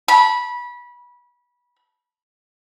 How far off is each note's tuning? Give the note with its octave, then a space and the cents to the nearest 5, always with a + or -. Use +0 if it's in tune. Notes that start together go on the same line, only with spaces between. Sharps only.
B5 -20